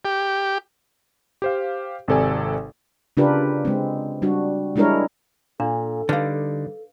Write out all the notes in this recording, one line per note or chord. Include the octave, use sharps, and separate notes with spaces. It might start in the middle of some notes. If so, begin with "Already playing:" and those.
G4
G4 C5 F5
G#1 C3 A4 D5 G#5
C#3 D4 F4 G4 A#4 B4
G#3 C4
G3 D4 F#4
G3 G#3 D4 E4 A#4 C#5
A#2 D4 A4
D3 G3 D4 D#4 B4 F5